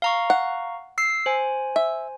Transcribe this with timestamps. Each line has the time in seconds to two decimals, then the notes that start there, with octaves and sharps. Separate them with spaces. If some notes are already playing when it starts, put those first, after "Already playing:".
0.02 F5 A#5 C#6
0.30 F#5
0.98 E6 C7
1.26 C5 G#5
1.76 E5